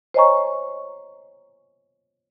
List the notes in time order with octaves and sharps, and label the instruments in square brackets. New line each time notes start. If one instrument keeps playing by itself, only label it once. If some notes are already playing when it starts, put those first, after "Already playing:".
[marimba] C5 C#5 D#5 G#5 A#5 C#6